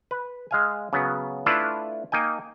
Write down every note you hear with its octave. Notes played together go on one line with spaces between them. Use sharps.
B4
G#3 F5 G#5
C#3 F#3 B3
A3 D4 E4 F4 B4
A#3 D#4 G5 G#5